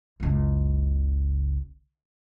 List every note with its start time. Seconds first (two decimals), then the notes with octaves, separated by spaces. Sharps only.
0.20 F#1 C#2